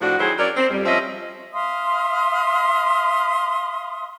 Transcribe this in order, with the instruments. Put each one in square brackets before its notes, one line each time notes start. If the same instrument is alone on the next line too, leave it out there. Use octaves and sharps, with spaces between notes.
[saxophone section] A2 F3 D4 F#4
D#3 F#3 E4 G#4 C5
F#3 C#4 A#4 D5
C4
F2 G3
F3 C4 C#4 D#5 E5
[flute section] E5 F5 C6 D#6